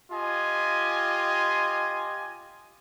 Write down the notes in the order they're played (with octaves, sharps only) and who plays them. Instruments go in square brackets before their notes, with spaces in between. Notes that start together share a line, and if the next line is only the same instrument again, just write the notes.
[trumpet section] F4 G4 D#5 G#5